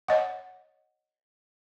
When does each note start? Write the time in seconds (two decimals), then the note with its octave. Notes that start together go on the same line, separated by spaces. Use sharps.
0.08 C#5 D#5 F#5